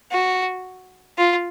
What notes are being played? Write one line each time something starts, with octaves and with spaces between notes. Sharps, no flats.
F#4
F4